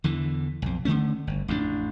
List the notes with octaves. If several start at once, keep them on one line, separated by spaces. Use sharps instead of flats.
E2 D3 E3
B1 F2
D3 D#3 A3 C#4
G1
A1 F2 C3 D4